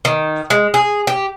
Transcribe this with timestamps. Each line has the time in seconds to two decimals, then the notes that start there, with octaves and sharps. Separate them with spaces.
0.05 D#3
0.50 G#3
0.74 G#4
1.07 G4